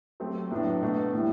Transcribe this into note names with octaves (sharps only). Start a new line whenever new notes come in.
F#3 A3 C4 G4
A2 F#3 B3 D4
B2 A3 D4 F#4
A2 E3 G3